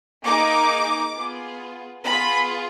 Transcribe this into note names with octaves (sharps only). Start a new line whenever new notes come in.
A#3 D#4 G#4 D6
B3 F4 G#4
B3 F4 G#4 B5